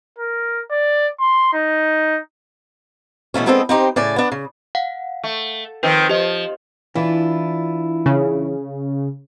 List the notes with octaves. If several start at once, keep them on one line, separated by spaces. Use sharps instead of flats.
A#4
D5
C6
D#4
B2 E3 A3 C#4
G#3 B3 C4 D4 A4 D#5
C4 D#4 G4 C5
A2 C#3 D5 G#5
B3 D4
C#3
F5 F#5
A3
D#3 F3 C4 B4
F3 G4 D#5
E3 D4 E4 F4
C#3